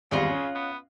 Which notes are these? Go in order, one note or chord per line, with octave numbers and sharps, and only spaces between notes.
G#1 E2 G2 C#3 F4 D#5 F#5
C#4
B3